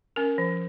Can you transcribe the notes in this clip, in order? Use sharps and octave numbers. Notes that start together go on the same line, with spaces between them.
C#4 A#4
F3